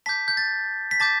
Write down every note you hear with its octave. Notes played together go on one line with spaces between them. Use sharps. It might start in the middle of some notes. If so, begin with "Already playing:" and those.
A5 D6 G6 B6
G6
A6
B6
A5 D6 G6 A6